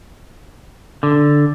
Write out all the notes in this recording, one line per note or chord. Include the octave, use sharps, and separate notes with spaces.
D3